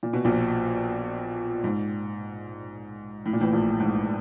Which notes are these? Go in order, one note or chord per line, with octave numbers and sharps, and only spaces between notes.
A#2
B2
A#1 A#2
G#2
A2
A#2
A1 A2
A#1 A#2
G#2